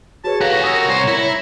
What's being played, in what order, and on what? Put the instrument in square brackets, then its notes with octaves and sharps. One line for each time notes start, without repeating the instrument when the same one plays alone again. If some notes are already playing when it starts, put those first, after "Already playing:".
[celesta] F#4 G#4 B4 [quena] C#5 [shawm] A5
[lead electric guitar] F#4 G4 [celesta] A4 F5 F#7 [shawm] A#5
[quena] C#5 [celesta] G#5 D#6 E6
[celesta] A#4
[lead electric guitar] C2 C5
[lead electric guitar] E4 [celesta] A#6